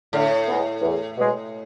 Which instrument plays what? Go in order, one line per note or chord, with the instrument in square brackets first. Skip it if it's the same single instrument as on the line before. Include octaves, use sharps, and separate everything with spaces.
[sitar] A2 [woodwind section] D3
[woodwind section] G#3 B3
E2
B2 G#3